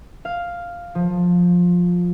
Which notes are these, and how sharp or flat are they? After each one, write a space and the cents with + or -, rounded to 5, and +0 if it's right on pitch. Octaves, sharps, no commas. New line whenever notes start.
F5 +0
F3 +15